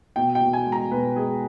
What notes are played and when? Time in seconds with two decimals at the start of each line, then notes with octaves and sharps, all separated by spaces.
0.16 B2 G5
0.35 G5
0.41 B2
0.53 G#5
0.66 G#3
0.72 A#5
0.91 B2 B4
1.16 G#3 G#4